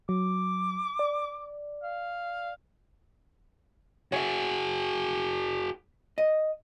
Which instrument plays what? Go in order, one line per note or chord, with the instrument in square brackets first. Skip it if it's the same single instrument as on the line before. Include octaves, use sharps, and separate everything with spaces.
[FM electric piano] F#3 [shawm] D6
[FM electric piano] D5
[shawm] F5
[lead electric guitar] F#4 G#4 [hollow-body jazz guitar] C#5 E5
[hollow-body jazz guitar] D#5